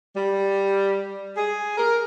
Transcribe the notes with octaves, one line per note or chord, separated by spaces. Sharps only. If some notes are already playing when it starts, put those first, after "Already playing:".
G3
G#4
A#4